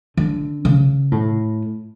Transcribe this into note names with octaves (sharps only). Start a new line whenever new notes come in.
D3
C#3
A2